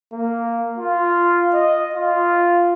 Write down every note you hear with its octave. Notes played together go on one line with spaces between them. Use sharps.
A#3
F4
D#5
F4